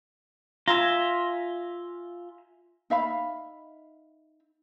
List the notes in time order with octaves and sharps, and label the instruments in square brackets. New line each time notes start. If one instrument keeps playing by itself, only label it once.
[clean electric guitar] F4 [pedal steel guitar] E5 G#5 A#5
[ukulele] D#4 E5 F5 B5